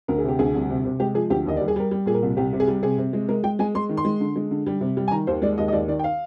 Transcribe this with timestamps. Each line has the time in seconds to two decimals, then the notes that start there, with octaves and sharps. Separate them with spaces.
0.08 D2 A#4
0.18 G#4
0.24 C3 G4
0.39 D2 G#4
0.55 C2
0.69 C3
0.85 C3
1.00 G#3 G4
1.14 F3 G#4
1.30 D2 G4
1.46 D#2 D#5
1.56 D5
1.61 G3
1.68 G#4
1.76 G3 A#4
1.91 G3
2.06 A#2 G#4
2.14 A#4
2.22 C2
2.37 C2 G4
2.53 C3
2.60 G#4
2.68 G3
2.82 C3 G#4
2.98 C3
3.13 G#3
3.29 G#3 A#4
3.43 G#3 G5
3.59 G#3 G#5
3.75 G#3 C6
3.89 D#3
3.97 C6
4.05 G#3
4.20 D3
4.36 G#3
4.51 D3
4.67 G3
4.81 C3
4.97 G3
5.08 G#5
5.11 D#3 A#5
5.27 D#2 C5
5.42 G#3 D5
5.58 D#2 D#5
5.68 D#5
5.72 D#2 D5
5.88 D#3 D5
5.99 G5
6.04 F5